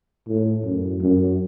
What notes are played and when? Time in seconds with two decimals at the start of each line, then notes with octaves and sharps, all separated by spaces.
0.28 A2
0.64 F#2
1.01 F#2